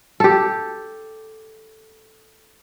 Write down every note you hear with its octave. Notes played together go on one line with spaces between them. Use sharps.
G4 A4